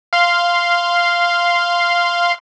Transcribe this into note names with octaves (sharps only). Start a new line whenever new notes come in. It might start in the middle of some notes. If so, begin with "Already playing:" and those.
F5 C6